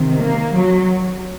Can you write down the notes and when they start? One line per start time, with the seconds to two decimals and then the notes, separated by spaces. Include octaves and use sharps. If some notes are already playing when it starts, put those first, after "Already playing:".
Already playing: C3 D#3
0.20 A#3
0.55 F#3